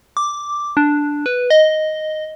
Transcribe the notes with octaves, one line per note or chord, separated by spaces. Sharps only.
D6
D4
B4
D#5